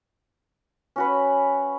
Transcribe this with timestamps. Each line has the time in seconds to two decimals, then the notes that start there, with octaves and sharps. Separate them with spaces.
0.96 C#4 F#4 B4